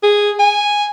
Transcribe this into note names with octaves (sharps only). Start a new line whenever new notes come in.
G#4
G#5